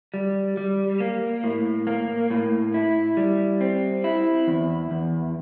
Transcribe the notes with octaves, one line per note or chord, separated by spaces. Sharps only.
G3
G3
A#3
A2
A#3
A2
E4
G3
C4
E4
E2
E2